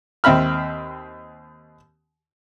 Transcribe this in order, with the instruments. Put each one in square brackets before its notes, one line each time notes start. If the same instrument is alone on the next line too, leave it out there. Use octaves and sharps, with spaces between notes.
[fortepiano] D#2 C4 E5 B5 F6